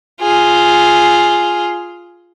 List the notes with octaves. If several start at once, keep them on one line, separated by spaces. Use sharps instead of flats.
F4 G#4